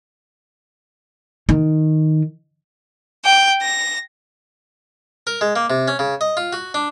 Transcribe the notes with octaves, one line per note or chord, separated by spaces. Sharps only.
D#3
G5
A#6
A#4
G#3
A#3
C3
C#4
C#3
D#5
F4
F#4
D4